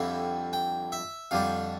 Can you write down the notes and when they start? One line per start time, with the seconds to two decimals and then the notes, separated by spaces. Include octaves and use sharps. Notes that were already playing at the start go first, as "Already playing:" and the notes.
Already playing: F2 D3 G3 C4 E4 F5
0.53 G5
0.92 E5
1.31 F2 D3 G3 D4 F5